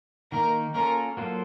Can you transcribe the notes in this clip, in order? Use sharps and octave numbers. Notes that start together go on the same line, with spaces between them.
D#3 A#3 D#4 A#4
A#3 C#4 F4 A4 A#4
F#3 A#3 F4 A4 C5